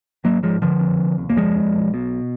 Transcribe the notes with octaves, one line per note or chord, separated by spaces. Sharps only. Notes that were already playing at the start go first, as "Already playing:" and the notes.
G#1 F#3 A#3
G#2 F3 G#3
F#1 D3 F3
F2
F1
D#2
A#3
F#1 F3 G#3
F2
B1
B2